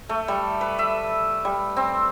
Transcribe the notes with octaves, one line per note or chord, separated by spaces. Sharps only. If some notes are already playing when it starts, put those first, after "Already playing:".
A3
G3
B4
E5
G3
C4